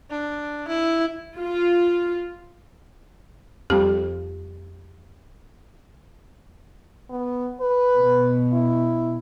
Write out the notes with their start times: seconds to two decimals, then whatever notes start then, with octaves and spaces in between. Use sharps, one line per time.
0.10 D4
0.68 E4
1.37 F4
3.70 F2 F3 G3 G4
7.10 B3
7.61 B4
7.99 B2
8.53 E4